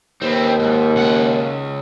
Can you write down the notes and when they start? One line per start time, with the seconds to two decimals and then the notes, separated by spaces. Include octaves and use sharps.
0.21 D#2 B3 C4
0.59 G#2
0.96 C#2 F#5